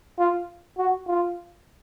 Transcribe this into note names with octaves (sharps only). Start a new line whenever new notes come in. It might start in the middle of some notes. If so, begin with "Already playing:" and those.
F4
F#4
F4